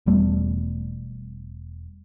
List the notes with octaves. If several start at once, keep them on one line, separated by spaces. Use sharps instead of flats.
E1 E2 G3 A3